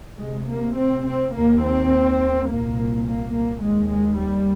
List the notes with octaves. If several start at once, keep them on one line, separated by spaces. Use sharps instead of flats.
D2 C3 G#3
A#3
C4
C4
D#2 A#3
C4
C2 A#2 A#3
A#3
A#3
D#2 G#3
G#3
G3